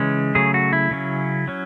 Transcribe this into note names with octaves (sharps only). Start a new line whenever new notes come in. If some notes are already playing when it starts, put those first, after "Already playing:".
Already playing: C#3 E3 G#3 C#4
C#3 F#3 A3 G#4
F#4
E4
C#3 F#3 C#4
F#3 C#4